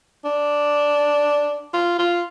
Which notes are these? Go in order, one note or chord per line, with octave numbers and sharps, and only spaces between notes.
D4
F4
F4